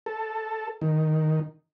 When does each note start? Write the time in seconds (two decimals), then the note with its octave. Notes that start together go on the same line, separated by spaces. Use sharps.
0.06 A4
0.81 D#3